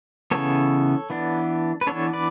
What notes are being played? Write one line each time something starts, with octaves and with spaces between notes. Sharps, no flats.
C#3 E3 B3 A4 C#5
E3 B3 D4
B4
E3 B3 D4 A4 C#5
B4 D5